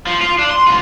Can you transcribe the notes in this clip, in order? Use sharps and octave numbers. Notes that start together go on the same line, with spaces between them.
F3
F4
D4
C6
D2 F4